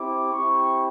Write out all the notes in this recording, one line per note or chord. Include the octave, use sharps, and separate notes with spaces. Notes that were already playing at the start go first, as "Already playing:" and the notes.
Already playing: C4 E4 G4 D6
C4 E4 G4 C#6